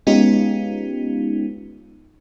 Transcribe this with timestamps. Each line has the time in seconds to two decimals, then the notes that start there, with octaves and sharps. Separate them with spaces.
0.07 G#3 B3 C#4 D#4 F4 G4